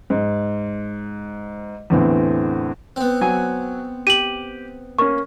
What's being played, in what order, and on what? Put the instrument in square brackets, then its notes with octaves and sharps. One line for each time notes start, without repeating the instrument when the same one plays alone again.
[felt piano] G#2
E2 A2 D3 E3 C4
[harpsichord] B3 C4
[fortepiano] F#3 G#5
[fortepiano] G4 [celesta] D#7 F#7
[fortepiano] A#3 C#4 [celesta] C#6